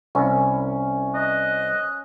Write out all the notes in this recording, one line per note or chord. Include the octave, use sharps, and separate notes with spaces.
C2 C#4
D#5 F#6